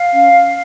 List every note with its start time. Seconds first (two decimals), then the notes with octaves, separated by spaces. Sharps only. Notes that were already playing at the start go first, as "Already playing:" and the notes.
Already playing: F5
0.12 C#4